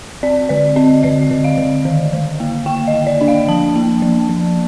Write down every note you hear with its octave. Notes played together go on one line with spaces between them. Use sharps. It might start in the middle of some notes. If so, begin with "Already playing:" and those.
C4 D5
D3 D5
C4 D#5
D3 D#5
D3
F5
D3
D#3
D#3
A#3
A#3 G5
D#5
A#3
D5
D4
F5
F3 A5
A#3
F3
F3